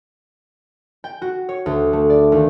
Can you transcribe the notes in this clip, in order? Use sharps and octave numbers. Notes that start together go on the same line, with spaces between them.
G5
F#4
C#5
D2
A3
D5
D#2